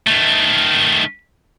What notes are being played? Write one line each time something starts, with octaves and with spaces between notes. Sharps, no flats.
D#3 A3